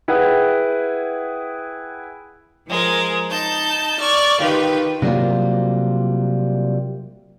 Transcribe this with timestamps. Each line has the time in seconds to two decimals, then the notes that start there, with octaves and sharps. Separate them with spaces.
0.08 E4 G#4 B4 F#5 G5
2.68 F3 G#3 A#4
3.29 D#4 A5 G6
4.00 D5 C#6 F6
4.39 D#3 F4 G4 B4
5.02 C3 F#3 G3 A#3 F4